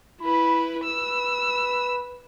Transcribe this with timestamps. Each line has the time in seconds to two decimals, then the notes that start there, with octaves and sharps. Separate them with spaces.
0.21 E4 B4 B5
0.84 B4 E6